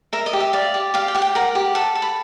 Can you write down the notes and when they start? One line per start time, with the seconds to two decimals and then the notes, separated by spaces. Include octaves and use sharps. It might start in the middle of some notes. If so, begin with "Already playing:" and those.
0.13 A#4 E5
0.26 D#5
0.33 G4
0.40 E5
0.53 D5 F5
0.74 G4
0.94 G4 F5
1.08 G5
1.15 G4 F#5
1.22 G5
1.35 A#4 F#5
1.55 G4
1.75 A4 F#5
1.95 A4
2.02 B5